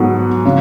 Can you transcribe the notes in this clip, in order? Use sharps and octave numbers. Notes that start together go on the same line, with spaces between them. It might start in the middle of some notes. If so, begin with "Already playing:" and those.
Already playing: G#2 F#3 B3 F#4 A4
C#3